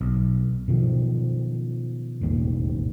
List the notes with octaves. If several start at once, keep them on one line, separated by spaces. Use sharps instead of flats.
B1
B2 D#3 F3
E1 A1 D#2